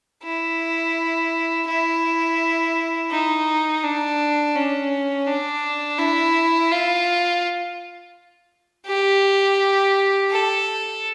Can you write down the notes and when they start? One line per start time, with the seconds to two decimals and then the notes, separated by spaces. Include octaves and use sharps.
0.24 E4
1.68 E4
3.11 D#4
3.83 D4
4.55 C#4
5.27 D4
5.99 E4
6.71 F4
8.87 G4
10.31 A4